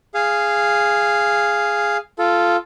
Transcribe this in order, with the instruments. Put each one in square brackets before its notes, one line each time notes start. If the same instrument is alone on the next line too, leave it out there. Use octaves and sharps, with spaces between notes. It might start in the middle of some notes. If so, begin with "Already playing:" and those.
[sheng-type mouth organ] G#4 F5
F4 A4